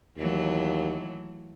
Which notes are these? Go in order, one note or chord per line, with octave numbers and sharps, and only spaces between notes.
D#2 E3 F#3 A3